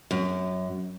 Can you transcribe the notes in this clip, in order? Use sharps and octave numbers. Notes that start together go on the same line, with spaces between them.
F#2